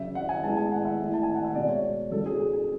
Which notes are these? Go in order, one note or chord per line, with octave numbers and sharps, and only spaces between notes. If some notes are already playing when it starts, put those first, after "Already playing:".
Already playing: F#2 C#3 F#3 E5
F#5
G#5
A2 G#3 B3 A5
G#5
F#5
E5
A2 E3 A3
A5
G#5
F#5
E5
B2 G#3 B3 D5
C#5
F#2 C#3 F#3 B3 A4
G#4
G#4
G#4